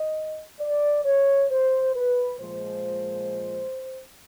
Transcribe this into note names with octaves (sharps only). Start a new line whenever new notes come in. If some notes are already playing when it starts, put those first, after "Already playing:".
Already playing: D#5
D5
C#5
C5
B4
A#2 F3 G#3 C5